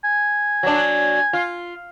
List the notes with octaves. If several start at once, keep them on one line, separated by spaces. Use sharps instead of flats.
G#5
F#3 D4
F4